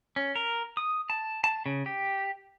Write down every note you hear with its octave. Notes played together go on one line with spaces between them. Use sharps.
C#4
A#4
D#6
A5
A5
C#3
G4